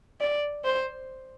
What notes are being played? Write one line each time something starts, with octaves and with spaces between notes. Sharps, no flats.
D5
C5